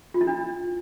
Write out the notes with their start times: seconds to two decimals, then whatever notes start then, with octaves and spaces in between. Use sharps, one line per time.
0.14 F4
0.21 E4
0.27 D4